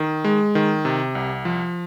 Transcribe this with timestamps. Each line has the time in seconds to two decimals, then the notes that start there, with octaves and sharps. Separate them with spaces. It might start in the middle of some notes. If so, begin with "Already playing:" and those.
Already playing: D#3
0.24 G#3
0.55 D#3
0.85 C3
1.15 C2
1.45 F3